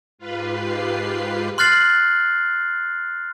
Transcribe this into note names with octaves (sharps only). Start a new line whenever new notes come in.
G#2 F4 G4 B4 C7
C6 F6 F#6 A6 C7 F#7